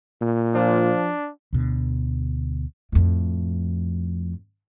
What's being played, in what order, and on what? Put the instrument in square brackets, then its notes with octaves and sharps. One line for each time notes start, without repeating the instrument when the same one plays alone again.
[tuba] A#2
[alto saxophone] F3 [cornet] D4
[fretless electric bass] D2 B2 D3
[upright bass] F2 A2